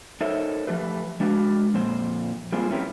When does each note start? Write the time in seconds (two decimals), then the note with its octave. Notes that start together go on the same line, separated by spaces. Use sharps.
0.21 D#4 A4 A#4 C5 C#5 E5
0.67 F3 A3 G4 B4
1.20 G#3 D4 F#4 B4 F5
1.74 F2 A#2 C5
2.52 G3 A#3 C4 F4 G#4 C5
2.70 C4 C#4 E4 G4 A#4 B4